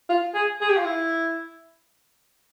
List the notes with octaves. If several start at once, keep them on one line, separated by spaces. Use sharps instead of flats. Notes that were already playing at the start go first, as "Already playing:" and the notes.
F4
G#4
G#4
G4
F4
E4